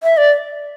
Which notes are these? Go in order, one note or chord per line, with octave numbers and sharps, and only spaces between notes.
E5
D5